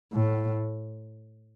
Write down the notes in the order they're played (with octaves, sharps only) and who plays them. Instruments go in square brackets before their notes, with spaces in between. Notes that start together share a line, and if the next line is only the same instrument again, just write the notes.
[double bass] A2